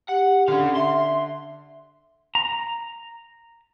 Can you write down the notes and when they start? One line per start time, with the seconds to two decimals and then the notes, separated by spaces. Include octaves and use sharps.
0.09 G4 F#5
0.48 D3 C#4 F5
0.75 E5 C6
2.35 A#5